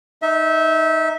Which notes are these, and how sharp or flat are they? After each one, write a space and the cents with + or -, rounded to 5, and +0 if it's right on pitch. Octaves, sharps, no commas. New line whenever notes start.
D#4 +0 E5 -25